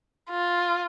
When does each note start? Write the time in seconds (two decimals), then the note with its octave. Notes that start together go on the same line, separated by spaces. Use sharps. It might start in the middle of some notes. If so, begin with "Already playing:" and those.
0.30 F4